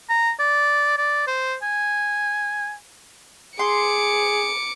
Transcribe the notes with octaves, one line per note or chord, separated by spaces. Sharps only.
A#5
D5
D5
C5
G#5
G#4 C6 D6 C#7